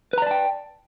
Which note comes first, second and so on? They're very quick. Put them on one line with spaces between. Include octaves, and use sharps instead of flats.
B4 A#5 D5 A5 G5